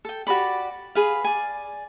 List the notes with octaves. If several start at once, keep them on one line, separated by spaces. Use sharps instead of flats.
A4 G5
F#4 G4 D5 B5
G#4 B4 F5
D5 G#5